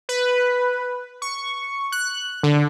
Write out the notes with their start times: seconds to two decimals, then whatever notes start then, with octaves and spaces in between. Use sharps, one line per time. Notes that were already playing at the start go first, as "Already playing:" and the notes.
0.09 B4
1.22 C#6
1.92 F#6
2.43 D3